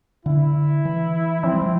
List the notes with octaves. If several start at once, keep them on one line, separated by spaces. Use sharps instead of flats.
D3 E4
E3
F3 C4
G3
F3